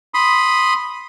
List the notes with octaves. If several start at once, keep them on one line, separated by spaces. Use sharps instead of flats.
B5 C6 D#6